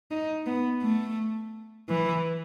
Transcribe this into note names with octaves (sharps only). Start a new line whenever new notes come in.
D#4
B3
A3
E3